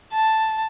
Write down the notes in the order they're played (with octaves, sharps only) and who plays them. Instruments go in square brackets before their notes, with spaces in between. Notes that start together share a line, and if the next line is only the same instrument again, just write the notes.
[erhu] A5